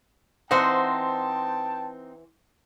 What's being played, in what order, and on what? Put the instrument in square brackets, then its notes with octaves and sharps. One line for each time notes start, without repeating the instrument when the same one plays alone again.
[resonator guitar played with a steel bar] E3 C5 F#5 [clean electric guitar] C4 D#4 [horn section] G5 A5